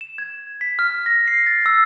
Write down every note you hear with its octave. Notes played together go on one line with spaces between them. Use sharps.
E7
G#6
B6
F6
A#6
C7
A6
E6